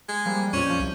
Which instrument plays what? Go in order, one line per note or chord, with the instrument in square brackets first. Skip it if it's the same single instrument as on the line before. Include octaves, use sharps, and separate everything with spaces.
[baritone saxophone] G#3
[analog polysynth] F3 G3 A#3
[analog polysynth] F2 A#2 D5 [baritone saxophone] C#4
[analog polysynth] F3 G6
C2